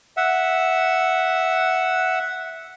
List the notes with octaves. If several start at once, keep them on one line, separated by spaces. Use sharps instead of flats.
E5 F#5